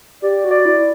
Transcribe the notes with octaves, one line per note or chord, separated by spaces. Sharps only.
G4 D5
F#4
D5
E4